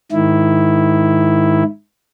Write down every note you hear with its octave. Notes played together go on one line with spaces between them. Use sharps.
G#2 D#3 E4